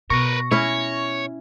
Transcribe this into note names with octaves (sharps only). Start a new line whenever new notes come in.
B2 A#4 B4 C#6 A#6
C#4 E4 C#5